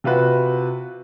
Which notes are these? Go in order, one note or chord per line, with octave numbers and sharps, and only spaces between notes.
C3 F4 F#4 B4